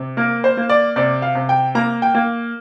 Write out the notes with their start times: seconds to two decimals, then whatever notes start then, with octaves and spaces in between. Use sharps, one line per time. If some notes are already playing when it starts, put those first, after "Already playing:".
Already playing: C3
0.17 A#3 A#4
0.44 C5
0.57 A#3
0.69 D5
0.96 C3 D5
1.22 F5
1.35 C3
1.49 G5
1.75 A#3 A#5
2.02 G5
2.14 A#3